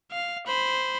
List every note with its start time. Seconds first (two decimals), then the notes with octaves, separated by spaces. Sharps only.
0.12 F5
0.46 C5 B5